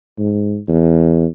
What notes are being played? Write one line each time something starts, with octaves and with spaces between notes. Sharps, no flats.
G#2
E2